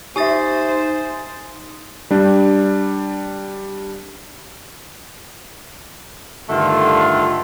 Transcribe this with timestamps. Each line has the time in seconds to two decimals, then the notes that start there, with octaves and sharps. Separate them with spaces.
0.16 D#4 G4 C5 E5 G#5 D#6 A6
2.11 G3 D4
6.50 G2 D3 D#3 A3 F4